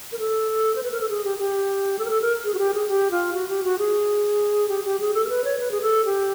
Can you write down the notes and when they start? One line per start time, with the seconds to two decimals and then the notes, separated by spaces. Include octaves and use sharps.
0.12 A#4
0.19 A4
0.76 C5
0.83 B4
0.92 A#4
1.01 A4
1.09 G#4
1.25 G4
1.38 G4
1.99 A4
2.05 A#4
2.10 A4
2.22 A#4
2.44 G#4
2.54 F#4
2.59 G4
2.74 G#4
2.89 G4
3.11 F4
3.34 F#4
3.49 G4
3.64 F#4
3.79 G#4
4.69 G4
4.85 G4
5.00 G#4
5.14 A4
5.24 A#4
5.29 B4
5.44 C#5
5.59 B4
5.71 G#4
5.82 A4
6.05 G4